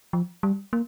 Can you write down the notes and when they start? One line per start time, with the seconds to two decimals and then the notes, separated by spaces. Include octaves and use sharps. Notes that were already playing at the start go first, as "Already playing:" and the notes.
0.13 F3
0.43 G3
0.73 A#3